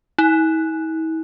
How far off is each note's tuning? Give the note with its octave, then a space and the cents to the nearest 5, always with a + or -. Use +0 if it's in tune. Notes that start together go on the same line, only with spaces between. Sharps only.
E4 -45